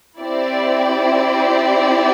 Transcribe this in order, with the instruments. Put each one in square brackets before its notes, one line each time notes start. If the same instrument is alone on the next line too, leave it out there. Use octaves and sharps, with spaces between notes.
[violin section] C4 E4 G4 D5